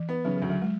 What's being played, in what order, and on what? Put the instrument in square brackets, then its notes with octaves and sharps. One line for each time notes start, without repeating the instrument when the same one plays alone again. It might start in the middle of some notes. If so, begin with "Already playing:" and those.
Already playing: [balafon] E3
[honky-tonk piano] B3
[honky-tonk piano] C#3 [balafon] F#3
[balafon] F#3
[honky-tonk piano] D2
[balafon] F#3
G#3